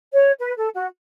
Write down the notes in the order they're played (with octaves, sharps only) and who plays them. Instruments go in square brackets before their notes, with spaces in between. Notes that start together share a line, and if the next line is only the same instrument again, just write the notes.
[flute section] C#5
B4
A4
F#4